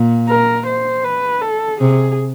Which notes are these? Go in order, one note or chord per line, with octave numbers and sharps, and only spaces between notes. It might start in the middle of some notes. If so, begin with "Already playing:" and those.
Already playing: A#2
A#4
C5
B4
A4
C3 G#4